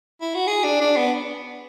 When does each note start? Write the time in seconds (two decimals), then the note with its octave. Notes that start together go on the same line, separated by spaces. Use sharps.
0.21 E4
0.35 F#4
0.48 G#4
0.64 D4
0.81 D4
0.97 B3